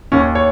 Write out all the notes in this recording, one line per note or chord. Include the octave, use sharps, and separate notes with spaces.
D#2 C#4
C#5